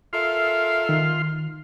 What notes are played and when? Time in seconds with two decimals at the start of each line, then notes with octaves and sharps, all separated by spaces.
0.13 F4 A4 A#4 E5 F5 C6
0.89 D#3